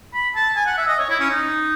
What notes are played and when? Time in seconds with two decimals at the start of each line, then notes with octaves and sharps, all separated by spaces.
0.14 B5
0.36 A5
0.56 G#5
0.66 F#5
0.78 E5
0.88 D#5
0.99 C#5
1.10 E4
1.20 C#4
1.30 D#4